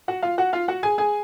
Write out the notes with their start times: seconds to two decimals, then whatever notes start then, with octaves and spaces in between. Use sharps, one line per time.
0.08 F#4 F#5
0.22 F4 F5
0.38 F#4 F#5
0.53 F4 F5
0.68 F#4 F#5
0.83 G#4 G#5
0.98 G#4 G#5